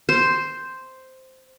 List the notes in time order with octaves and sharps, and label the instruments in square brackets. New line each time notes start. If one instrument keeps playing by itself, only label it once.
[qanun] C5